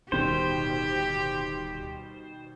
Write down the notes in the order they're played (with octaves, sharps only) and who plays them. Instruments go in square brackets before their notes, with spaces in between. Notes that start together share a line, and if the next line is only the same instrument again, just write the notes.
[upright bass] D1 C#4 [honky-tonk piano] B2 D#3 G3 [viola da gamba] G4 [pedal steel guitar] C5